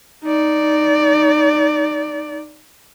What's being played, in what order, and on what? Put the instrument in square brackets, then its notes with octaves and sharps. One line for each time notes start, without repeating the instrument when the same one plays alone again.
[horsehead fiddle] D#4 D5